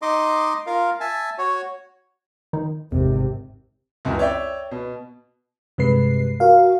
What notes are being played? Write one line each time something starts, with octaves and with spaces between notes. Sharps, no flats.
D#4 D#5 C6 D6
F4 A#4 F5
E5 G#5 A5
F#4 C#5
D#3 D#4
G#1 E2 C3
C#2 F#2 E3
C#5 D5 E5 G5
B2
G2 C3 G#3 B4 C7
F#4 A#4 F5